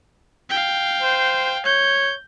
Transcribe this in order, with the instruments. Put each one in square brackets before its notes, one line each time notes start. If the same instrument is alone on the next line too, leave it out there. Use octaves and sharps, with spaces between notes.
[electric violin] F5 G5
[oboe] C5
[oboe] C#5 [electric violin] G6